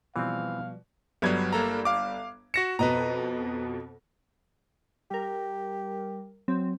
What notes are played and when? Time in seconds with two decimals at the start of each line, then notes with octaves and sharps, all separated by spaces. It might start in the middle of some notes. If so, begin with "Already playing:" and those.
0.16 B2 E3 F3 G3 C4 D5 F5
1.22 G1 F#3 G3 B3 G#6
1.53 A#3 A4 A#5
1.85 F5 D6
2.54 F#4 A#6 C#7 E7
2.79 F2 B2 B4 D#5 A#5
5.11 G3 G4 A#4
6.48 F#3 C4